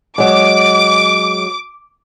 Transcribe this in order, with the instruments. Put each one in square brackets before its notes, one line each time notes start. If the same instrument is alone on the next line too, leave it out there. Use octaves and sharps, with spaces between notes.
[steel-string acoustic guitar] F#3 G#3 [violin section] D6